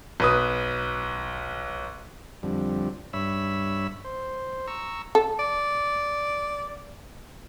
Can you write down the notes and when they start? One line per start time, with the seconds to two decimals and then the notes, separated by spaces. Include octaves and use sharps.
0.20 B1 B4 D#6
2.43 F2 D3 G3
3.13 G2 C#5 E5 B5 E6
4.05 C5
4.68 A#5 C#6 E6
5.15 A4
5.39 D5